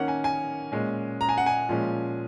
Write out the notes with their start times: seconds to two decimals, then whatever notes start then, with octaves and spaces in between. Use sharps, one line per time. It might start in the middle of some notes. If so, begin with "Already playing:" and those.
Already playing: D#3 A#3 C#4 F#5
0.08 G#5
0.24 G#5
0.72 A#2 G#3 C#4
1.21 A#5
1.29 G#5
1.38 F#5
1.46 G#5
1.69 A#2 F3 G#3 C#4